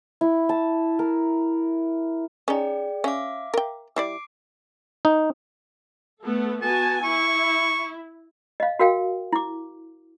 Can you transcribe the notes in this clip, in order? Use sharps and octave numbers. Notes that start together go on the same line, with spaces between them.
E4
A5
A#4
C#4 D#4 G#4 D5 G5
C#4 E5 F5 D6
A#4 G5
G3 E4 D5 D6 C7 D7
D#4
A3 B3 A4
B3 F#4 G#5 A5
E4 C#6
D#5 F5
F#4 A#4 F5 G5
E4 D6